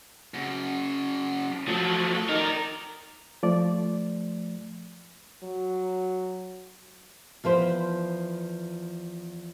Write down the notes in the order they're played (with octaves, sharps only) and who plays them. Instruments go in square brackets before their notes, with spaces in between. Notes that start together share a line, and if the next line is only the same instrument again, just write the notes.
[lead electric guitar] F#2 C#3
[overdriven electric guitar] F3 F#3 [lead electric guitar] A3
[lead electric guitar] A4
[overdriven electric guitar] D#4 A#4 [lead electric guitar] D5 D#5
[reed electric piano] F3 A3 D5
[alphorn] F#3
[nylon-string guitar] E2 F3 B4 C5